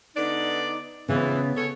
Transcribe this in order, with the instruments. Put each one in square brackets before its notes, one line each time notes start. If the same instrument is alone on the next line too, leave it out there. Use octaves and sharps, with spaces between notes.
[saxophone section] D3 B3 D5 [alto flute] D#4
[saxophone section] F2 G#2 E3 [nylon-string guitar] C#3 [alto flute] B3
[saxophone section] C#4 A4 C#5